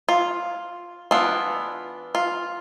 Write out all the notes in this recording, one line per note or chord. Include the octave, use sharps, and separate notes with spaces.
F4
E3 B3 D4 F4
F4